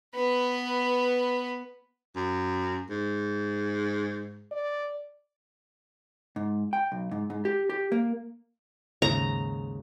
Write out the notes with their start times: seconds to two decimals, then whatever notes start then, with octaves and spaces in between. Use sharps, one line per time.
0.15 B3 B4
2.16 F#2
2.90 G#2
4.51 D5
6.36 G#2
6.73 G5
6.92 B1
7.11 G#2
7.30 G#2
7.45 G4
7.70 G4
7.92 A#3
9.02 D#2 G#2 C#3 A#5